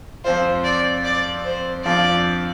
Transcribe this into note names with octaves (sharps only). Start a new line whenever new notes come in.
F2 F3 C4 F4 C5
D5
D5
C5
F2 F3 D4 F4 D5